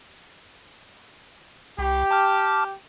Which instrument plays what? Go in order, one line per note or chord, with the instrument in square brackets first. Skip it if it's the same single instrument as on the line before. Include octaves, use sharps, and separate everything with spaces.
[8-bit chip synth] C2 [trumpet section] G4
[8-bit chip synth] A5 D6 F6